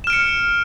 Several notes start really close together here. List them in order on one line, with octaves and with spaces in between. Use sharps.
E7 F6 D7 C#7